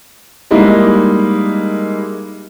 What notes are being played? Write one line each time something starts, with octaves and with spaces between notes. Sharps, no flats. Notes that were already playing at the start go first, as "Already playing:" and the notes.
G3 G#3 A#3 D#4 E4